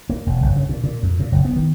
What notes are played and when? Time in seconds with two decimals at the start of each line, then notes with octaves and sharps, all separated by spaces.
0.10 A#3
0.26 E1
0.42 F#1
0.56 C#3
0.69 A#2
0.84 A#2
1.03 F2
1.20 A#2
1.32 F#1
1.45 B3
1.56 D#3